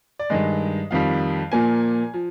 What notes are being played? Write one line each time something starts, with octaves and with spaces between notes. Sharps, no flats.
D5
G2 D#3 G#3 D#5
F2 D#3 G3 F5
A#2 F3 A#3 G#5
F3